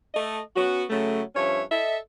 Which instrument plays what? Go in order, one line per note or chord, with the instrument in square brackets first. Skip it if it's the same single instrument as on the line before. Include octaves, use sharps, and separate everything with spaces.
[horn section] A3 D#5
B3 C#4 F#4
C#3 F#3 A3
G2 F3 C#4 C#5 E5
A4 D#5 E5